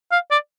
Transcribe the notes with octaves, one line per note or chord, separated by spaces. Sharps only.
F5
D5